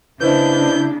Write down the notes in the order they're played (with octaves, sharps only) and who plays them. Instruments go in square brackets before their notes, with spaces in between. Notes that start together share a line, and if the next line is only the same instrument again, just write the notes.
[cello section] C#3 A#3 D4 [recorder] E4 [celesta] B4 C5 D#5 [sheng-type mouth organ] G6